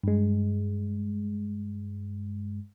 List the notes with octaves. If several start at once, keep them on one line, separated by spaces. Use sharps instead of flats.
G2 G#3